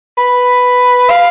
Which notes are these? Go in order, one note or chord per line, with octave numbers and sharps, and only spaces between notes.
B4
F5